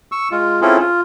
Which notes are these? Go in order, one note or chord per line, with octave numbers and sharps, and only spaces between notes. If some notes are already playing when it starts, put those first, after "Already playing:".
C#6 E6
G#3 F4
C4 C#4 E4 F4 G#4 A4
F4